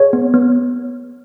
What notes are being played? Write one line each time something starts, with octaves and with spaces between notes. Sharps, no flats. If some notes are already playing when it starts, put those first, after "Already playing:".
Already playing: G#4 C#5
B3
B3